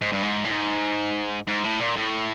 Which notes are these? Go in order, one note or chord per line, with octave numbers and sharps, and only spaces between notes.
G#2
G2
G#2
A2
G#2
G#2
A2
A#2
A2